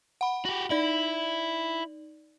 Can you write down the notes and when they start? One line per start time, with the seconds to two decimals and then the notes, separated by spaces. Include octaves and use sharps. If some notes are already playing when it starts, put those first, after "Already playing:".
0.21 F#5 B5
0.45 F#4 G4
0.70 D#4 E4 D5 F#7